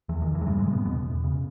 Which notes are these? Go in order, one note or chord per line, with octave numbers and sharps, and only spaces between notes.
E2 E3
D#3
E2
E3
G#3
G2 C#3 G3
G#2 G#3
C#3
B2 B3
E2 B2 B3
E2
C#3